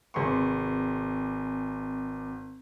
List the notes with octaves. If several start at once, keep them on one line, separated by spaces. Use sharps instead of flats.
G#1 C3 G#4 B4 C6 C#6